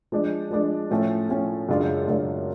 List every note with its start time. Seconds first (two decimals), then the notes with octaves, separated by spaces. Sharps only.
0.12 F3 G#3 D4
0.51 F3 G#3 D4
0.90 A2 F3 A3 C#4
1.29 A2 F3 A3 C#4
1.69 F#2 C#3 G#3 D4 F4
2.08 F#2 C#3 G#3 D4 F4